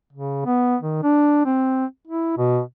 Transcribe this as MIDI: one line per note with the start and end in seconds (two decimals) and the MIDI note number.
0.13 0.44 49
0.45 0.76 59
0.81 0.98 51
1.03 1.42 62
1.45 1.85 60
2.07 2.37 64
2.37 2.60 47